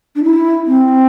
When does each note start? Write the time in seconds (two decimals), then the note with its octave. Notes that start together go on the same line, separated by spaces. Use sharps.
0.16 D4
0.24 E4
0.66 C4